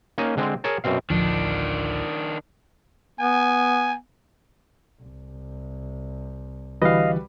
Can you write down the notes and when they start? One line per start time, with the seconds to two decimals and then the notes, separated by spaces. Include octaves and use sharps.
0.18 A#3 C#4 D#4 D#5
0.37 D3 G#3 C4
0.64 G#4 A#4 C#5 A5
0.84 F#2 B2 C4 F5
1.10 A1 D2 D#3 F3 D4
3.20 B3 G#5
5.03 C2
6.82 D3 E3 G3 F#4 B4 D#5 F5